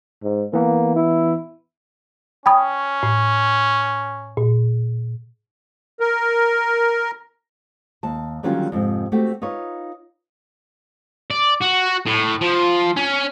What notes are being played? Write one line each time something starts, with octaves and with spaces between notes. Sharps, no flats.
G#2
E3 A#3 B3
E4
C#4 G5 B5 D#6
A2
A#2
A#4
D#2 A5
D3 D#3 F#3 G3 C#4 F4
F2 G#2 C3
A3 C4 F#4 G4
D#4 F4 B4 C#5
D5
F#4
A2
F3
C#4